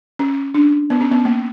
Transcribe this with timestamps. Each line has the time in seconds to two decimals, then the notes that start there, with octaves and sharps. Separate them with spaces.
0.19 C#4
0.54 D4
0.90 B3
1.01 C#4
1.11 B3
1.25 A#3